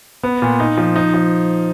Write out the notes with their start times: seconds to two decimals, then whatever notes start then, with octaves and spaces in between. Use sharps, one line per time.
0.23 B3
0.42 A#2
0.60 D#4
0.77 F3
0.96 D#4
1.14 F3